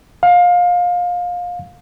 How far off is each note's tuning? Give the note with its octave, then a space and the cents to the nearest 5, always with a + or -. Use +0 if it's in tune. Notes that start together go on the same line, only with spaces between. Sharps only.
F5 +25